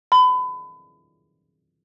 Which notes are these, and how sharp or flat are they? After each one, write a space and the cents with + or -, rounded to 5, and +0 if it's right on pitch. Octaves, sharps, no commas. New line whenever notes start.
B5 +30